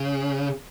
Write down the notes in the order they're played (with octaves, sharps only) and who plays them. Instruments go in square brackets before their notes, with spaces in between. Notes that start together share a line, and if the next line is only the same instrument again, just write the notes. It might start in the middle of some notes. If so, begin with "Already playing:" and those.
Already playing: [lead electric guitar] C#3